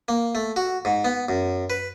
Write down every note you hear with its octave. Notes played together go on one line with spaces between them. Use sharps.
A#3
A3
F#4
G#2
B3
F#2
B4